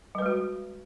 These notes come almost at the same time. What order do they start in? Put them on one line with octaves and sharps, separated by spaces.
G3 B4 G#3 F#4